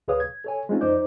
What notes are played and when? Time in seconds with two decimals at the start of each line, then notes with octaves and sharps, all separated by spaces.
0.08 D2 G#4 B4 C#5 F5 D#6
0.20 G#6
0.44 A4 C#5 G#5
0.69 G#3 A3 C4 C#4 D#4 F4
0.81 F2 D#4 C5 D5 D6 G6